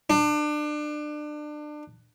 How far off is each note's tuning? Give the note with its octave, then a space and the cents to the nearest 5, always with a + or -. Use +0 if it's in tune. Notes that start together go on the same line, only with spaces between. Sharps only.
D4 +30